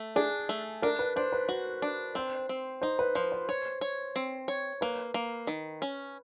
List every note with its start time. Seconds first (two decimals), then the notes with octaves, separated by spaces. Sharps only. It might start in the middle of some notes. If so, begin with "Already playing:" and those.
Already playing: A3
0.16 D4 G#4
0.49 A3
0.82 D4 A#4
0.99 B4
1.16 D4 C5
1.32 B4
1.49 F#4 C5
1.82 D4
2.15 C4 C5
2.49 C4
2.82 D#4 C5
2.99 B4
3.15 F3 C5
3.32 C5
3.49 C#5
3.81 C#5
4.16 C4
4.48 C#5
4.81 A#3 B4
5.14 A#3
5.47 D#3
5.82 C#4